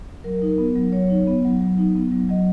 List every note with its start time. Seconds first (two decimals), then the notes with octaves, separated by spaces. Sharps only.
0.24 F#3 A#4
0.42 D#4
0.48 A#4
0.58 B3
0.75 F#3
0.92 F#3 C#5
1.10 D#4
1.27 B3
1.45 F#3
1.61 F#3
1.78 D#4
1.96 B3
2.12 F#3
2.29 F#3 D#5